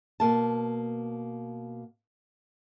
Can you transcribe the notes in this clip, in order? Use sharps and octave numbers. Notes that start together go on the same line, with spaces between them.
B2 A#3 A5